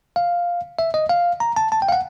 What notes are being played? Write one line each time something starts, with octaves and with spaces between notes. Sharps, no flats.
F5
E5
D#5
F5
A#5
A5
A5
G5
F5
F#5